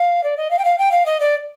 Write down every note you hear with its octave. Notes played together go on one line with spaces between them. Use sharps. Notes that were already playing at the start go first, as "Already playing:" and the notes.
Already playing: F5
D5
D#5
F5
G5
F5
G5
F5
D#5
D5